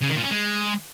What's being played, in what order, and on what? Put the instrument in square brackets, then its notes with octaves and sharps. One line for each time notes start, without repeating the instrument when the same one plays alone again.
[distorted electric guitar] C#3
D#3
A#2
C#4
G#3